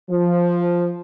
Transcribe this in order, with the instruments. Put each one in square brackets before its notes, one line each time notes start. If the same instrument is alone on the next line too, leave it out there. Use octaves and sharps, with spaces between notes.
[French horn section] F3